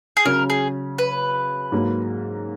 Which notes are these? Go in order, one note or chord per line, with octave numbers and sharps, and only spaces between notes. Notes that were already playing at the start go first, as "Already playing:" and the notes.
G#4
C#3 F#3 C#4 A#4
G#4
B4
G#2 F#3 A#3